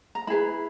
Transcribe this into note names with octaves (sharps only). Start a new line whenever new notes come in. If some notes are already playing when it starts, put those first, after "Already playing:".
A#5
E4 G#4 B4 B5